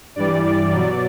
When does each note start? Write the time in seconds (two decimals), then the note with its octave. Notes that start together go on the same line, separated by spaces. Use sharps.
0.16 G2 E3 G3 D5
0.44 D5
0.73 B2 F#3